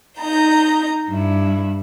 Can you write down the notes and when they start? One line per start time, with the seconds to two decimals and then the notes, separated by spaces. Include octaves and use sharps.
0.21 D#4 A#5 G6
1.09 G2 E4